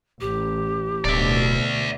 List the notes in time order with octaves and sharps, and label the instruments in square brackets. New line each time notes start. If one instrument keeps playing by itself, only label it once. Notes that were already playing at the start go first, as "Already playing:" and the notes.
[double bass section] A1 [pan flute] G4
[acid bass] D1 [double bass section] D2 B2 [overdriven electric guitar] D5 E5